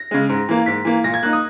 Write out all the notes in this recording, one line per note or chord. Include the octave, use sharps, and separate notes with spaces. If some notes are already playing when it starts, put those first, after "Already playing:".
Already playing: A#6
C#3 G#3
G#2
E3 A#3
G#2 B6
E3 A#3
A#2 A#6
G#6
A#3 D#4 F#6
D#6